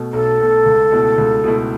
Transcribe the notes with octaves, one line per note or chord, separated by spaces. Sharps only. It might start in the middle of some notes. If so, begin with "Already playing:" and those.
Already playing: B2 A3
B1 A4
B2 A3
C#2
B2 A3 E4
C#2
B2 A3 E4